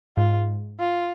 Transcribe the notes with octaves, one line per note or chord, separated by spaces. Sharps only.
G#2 F4
F4